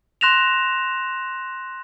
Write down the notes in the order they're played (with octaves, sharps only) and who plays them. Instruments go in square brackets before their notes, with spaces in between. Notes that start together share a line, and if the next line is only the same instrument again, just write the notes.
[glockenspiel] C6 F#6 A#6 E7 F7